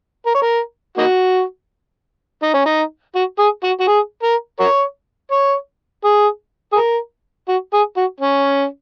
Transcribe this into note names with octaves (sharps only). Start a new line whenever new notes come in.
A#4
C#5
A#4
A#3 D#4 F#4
D#4
C#4
D#4
F#4
G#4
F#4
F#4
G#4
A#4
F#4 A#4 C#5
C#5
G#4
G#4
A#4
F#4
G#4
F#4
C#4